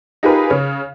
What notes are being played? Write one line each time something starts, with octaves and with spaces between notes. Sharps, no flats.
D#4 F4 G4 G#4 A#4 B4
C#3 C#5